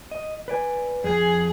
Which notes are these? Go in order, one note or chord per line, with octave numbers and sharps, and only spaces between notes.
D#5
B4 D5 G#5
F2 G#4 G#5